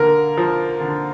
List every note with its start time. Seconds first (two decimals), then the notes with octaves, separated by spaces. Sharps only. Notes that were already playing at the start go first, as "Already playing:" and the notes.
Already playing: D3 A#3 A#4
0.38 F3
0.81 D3